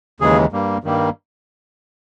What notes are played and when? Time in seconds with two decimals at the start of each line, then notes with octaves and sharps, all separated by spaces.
0.20 D#2 C#3 E3 G#3 G#4
0.52 G2 G3 A#3
0.84 G2 D#3 G3 A#3